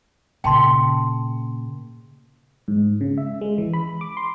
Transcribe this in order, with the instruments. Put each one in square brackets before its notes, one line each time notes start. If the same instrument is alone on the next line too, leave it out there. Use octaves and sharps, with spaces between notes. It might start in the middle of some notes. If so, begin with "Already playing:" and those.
[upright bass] A#2 C#3 [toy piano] G5 A5 C6
[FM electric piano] G#2
C#3
E5
G#3
E3
B5
D6
C6